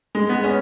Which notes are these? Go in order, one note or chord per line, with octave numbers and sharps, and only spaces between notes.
G#3
B3
C#4